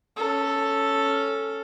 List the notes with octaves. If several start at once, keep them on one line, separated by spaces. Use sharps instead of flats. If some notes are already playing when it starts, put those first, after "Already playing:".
C#4 A4